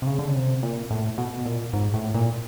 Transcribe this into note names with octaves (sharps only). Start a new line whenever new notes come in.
C3
C#3
D3
C#3
C3
A#2
A2
B2
A#2
G#2
A2
A#2